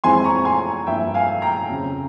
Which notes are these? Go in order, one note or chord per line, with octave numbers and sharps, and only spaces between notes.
F2 E3 G#3 C4 E4 G#5 C6
A#5 C#6
G#5 C6
G2 F3 A#3 E4 E5 G5
F5 G#5
G5 A#5
F2 C#3 F3